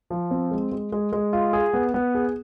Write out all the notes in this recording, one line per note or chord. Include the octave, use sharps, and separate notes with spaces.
F3
C4
G#3
G#3
G#3
G#3
F4
G#4
B3
B3
G#4